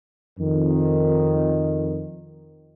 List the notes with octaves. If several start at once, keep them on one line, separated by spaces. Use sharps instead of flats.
F2 D#3